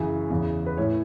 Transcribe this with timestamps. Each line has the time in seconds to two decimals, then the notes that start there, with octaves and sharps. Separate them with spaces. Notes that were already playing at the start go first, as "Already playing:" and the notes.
Already playing: F#2 C#3 E3
0.30 E2 C#3 E3
0.66 B4
0.77 A2 E3 C#5